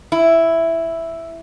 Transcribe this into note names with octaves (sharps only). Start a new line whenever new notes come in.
E4